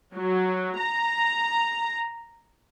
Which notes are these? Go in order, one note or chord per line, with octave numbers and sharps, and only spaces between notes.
F#3
A#5